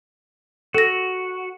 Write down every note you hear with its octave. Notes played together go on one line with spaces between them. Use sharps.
F#4 A4 A#6